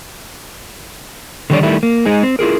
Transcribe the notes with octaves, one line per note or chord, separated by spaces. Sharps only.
D3 D#3 G3 G4 C#5 D5
D#3 G3 A3 E4
A#3
G#3 D#4 G#4
C4
E4 F4 G#4 A#4